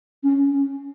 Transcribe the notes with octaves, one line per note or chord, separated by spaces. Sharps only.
C#4